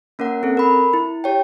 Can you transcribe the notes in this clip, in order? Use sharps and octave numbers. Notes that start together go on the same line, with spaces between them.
A#3 C#4 A#4 F#5
C4 A4
A#4 B5
E4
G4 C#5 G5